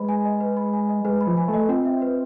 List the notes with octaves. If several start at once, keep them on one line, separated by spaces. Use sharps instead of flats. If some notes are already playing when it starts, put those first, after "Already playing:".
Already playing: G#3 B4 D#5 B5
G#5
D#5
B4
B5
G#5
D#5
G#3 B4
B5
F3
G#5
A3
D#5
C4 F4
E5
B4